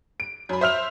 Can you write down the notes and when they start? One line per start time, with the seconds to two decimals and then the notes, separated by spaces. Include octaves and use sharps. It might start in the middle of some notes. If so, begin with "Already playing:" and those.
0.20 D7
0.49 F#2 B5
0.61 C5 E5 F6 F7